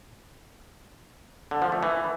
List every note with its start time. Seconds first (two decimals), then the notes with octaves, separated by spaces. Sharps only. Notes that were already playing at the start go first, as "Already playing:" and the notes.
1.51 D3
1.62 F3
1.72 A3
1.83 E3